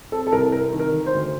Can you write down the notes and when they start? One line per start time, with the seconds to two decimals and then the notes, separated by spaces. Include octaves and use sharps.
0.12 C4 A4
0.27 A4
0.32 C2 A#4
0.52 C3 A#4
0.73 D#3
0.79 A#4
0.92 D#3
1.06 C5
1.13 D2